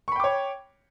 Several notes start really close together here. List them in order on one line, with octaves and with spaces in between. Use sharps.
C#6 B5 G5 D6 C#5